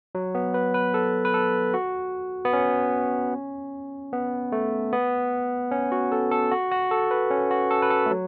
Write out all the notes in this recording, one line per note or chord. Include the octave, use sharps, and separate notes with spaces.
F#3
B3
B4
B4
A4
B4
A4
F#4
B3
C#4
B3
A3
B3
C#4
F#4
A4
A4
F#4
F#4
A4
B4
C#4
F#4
A4
B4
A4
A3
F#3